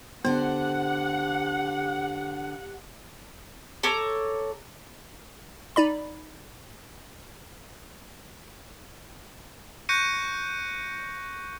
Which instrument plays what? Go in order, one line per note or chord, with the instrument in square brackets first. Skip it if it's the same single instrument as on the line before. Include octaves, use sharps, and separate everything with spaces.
[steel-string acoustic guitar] D3 C5 [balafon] B3 [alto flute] G4 [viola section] F#5
[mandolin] A4 C#5 A#5 D6
[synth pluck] D#4 D5 B5
[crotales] C#6 F#6 G6 A#6 C#7 D#7